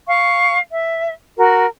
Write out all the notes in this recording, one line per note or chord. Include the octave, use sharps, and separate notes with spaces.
F5 C#6
E5
F#4 A#4